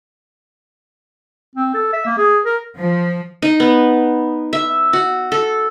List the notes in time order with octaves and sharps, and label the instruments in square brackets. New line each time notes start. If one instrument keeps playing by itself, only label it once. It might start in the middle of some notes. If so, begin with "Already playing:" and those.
[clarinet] C4
A4
E5
A#3
G#4
A#4
[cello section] F3
[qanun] D#4
B3
E5
F#4
A4